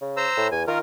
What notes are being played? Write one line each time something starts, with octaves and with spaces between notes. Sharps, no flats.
C#3
C5 A#5 E6
A2
E2 G#5
D#3 F4 A#4